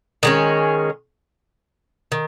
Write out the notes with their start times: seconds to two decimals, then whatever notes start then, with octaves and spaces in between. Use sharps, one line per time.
0.23 D#3 G#3 C#4
2.12 D#3